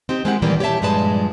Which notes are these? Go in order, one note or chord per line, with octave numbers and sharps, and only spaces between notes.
C4 D#4 G4
G#3 A#3 C4 E4 G4 F#5
A#2 D#3 E3 G3 A#3
G4 C#5 D5 E5 A5
G2 A#2 F3 G#3 B4 A5